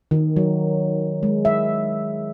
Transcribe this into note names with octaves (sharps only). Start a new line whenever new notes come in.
D#3
F#3
G#3
E5